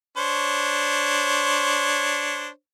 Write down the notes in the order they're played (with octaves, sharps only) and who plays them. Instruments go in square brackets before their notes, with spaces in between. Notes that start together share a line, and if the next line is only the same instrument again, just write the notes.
[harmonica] D4 C5 C#5